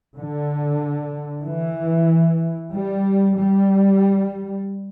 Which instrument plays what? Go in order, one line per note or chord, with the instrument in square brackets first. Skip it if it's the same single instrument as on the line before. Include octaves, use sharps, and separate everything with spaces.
[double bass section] D3
E3
G3
G3